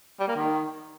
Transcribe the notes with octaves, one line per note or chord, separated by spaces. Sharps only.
G3
A#3
D#3